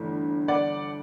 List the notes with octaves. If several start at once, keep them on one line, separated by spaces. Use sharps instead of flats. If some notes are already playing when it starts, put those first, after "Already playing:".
Already playing: G1 G2 E3 A3
D5 F#5